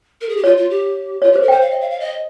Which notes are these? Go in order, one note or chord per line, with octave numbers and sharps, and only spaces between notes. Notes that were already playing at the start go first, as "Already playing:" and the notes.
A#4
G#4
G4
F4 C#5
F4
G4
F4 C#5
G4 C5
A#4
C5 G5
F5
D#5
F5
F5
D#5